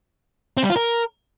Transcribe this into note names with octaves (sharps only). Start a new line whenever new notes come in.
C4
G3
F4
A#4